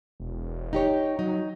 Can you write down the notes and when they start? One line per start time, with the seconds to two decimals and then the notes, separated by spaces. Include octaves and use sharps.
0.20 E1
0.73 D#4 G4 C#5
1.19 F#3 D#4